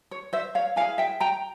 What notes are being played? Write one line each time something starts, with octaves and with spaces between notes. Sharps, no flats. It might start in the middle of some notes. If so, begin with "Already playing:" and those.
C#5
C5 E5
C#5 F5
E4 G#4 F5 G#5
E5 G5
G5 A#5